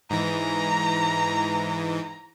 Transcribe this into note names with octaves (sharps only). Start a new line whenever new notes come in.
G#2 E3 A#5